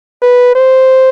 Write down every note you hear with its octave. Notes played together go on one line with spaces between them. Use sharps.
B4
C5